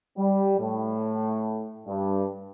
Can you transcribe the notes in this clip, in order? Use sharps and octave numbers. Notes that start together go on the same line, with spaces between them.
G3
A2
G2